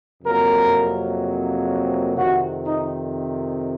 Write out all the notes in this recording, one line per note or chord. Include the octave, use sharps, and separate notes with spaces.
F2 C3 F#3 A#3 A#4
F2 C3 D#3 F#4
D#4